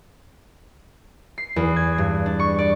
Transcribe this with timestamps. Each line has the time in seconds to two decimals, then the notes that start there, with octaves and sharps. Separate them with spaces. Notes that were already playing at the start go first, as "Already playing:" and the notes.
1.38 C7
1.56 E2
1.76 G#6
1.98 G2
2.26 D4
2.39 C#6
2.58 D5